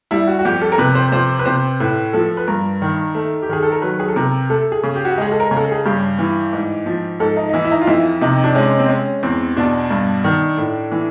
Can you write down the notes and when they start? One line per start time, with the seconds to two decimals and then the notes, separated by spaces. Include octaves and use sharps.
0.11 G3 E4
0.27 F#4
0.39 F#4
0.45 F2 G4
0.62 A4
0.72 A#4
0.78 C3 B4
0.95 C5
1.12 F2 C5
1.39 B4
1.45 C3 C5
1.80 A2 B4
2.13 F3 A4
2.37 B4
2.48 G2 A#4
2.82 D#3
3.15 A3
3.42 G4
3.49 D#3 G#4
3.63 A4
3.72 A#4
3.82 F#3 B4
4.00 G#4
4.08 A4
4.16 C3 A#4
4.50 A3 A4
4.72 G#4
4.83 C#3
4.95 G4
5.05 F#4
5.13 G4
5.18 G#3 G#4
5.32 A4
5.40 A#4
5.51 C#3
5.57 A4
5.72 G#4
5.85 G2 G4
6.19 E3
6.53 G#2
6.86 F3
7.20 G#2 A4
7.37 D#4
7.49 D#4
7.53 E3 E4
7.65 E4
7.71 D#4
7.81 F4
7.87 F2 E4
8.21 C3 D#4
8.44 D4
8.55 G#3 C#4
8.79 C4
8.89 G#3 C#4
9.23 E2 C4
9.57 B2 D4
9.91 G2
10.24 D#3
10.57 A2
10.92 E3